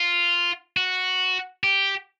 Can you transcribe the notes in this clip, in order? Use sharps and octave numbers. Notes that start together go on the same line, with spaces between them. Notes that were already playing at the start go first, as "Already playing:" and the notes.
Already playing: F4
F#4
G4